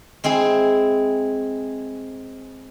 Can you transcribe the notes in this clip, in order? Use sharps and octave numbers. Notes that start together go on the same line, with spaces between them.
G#3 C4 E4 G#4